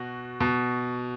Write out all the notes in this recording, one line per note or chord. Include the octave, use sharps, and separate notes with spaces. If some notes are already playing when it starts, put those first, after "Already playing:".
Already playing: B2 F#4
B2